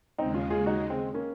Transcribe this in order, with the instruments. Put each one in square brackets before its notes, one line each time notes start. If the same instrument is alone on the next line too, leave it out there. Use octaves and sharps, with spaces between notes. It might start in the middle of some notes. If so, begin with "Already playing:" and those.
[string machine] D#2 C#3 G#3 [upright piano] C4 D#4
[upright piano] C#4 F4
F4 G#4
D#4 F#4
G#3 C4
A#3 C#4